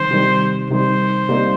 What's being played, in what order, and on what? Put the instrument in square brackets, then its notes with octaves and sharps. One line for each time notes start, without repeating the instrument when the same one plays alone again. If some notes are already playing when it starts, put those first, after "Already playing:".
Already playing: [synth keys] C3 D#3 G3 [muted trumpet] C5
[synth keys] C3 D#3 G3
[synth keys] C3 D#3 G3 [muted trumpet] C5
[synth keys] C3 G3 A#3 D#4